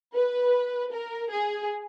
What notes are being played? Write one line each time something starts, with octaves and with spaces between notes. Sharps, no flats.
B4
A#4
G#4